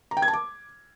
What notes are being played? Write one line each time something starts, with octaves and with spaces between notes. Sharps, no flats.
A#5
G5
G#6
A5
D6